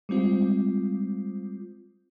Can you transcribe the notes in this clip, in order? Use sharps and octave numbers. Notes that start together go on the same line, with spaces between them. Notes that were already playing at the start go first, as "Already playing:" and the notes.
G3 G#3 C4 F4